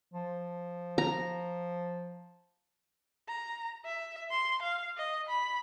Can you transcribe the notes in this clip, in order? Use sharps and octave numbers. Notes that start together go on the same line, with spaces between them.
F3
A#5
A#5
E5
C6
F5
D#5
B5